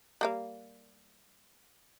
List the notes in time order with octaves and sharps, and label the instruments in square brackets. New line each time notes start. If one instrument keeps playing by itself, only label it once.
[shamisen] G3 A#3 F5